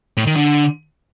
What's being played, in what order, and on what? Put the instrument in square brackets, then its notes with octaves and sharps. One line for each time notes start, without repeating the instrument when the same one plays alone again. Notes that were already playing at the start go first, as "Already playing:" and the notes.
[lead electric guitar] A2
D#3
D3